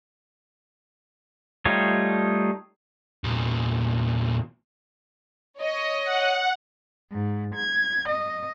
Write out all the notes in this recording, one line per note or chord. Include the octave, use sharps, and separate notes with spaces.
G3 A3 D#4 F4 C#5
E2 A#2
C#5 D#5
F#5
G#2
G#6
D#5